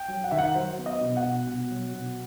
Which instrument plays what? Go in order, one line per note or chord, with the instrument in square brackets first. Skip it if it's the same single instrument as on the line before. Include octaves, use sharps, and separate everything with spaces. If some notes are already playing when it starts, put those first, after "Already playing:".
Already playing: [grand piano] G5
F#3
F#5
D#3 E5
F#5
F#3 C5
B3
D#5
B2
F#5
B2
B2
F#3
B2